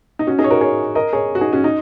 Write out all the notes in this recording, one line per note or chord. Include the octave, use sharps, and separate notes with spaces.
D#4
C#4 F#4
D#4 G#4
C#5
F#4 A#4
G#4 C#5
A#4 D#5
G#4 C#5
F#4
D#4 G#4
C#4 F#4
D#4